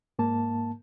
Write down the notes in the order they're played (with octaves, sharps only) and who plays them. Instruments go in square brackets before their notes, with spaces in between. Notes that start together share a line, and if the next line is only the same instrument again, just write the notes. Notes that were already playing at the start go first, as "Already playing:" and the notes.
[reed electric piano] G#2 A#3 A5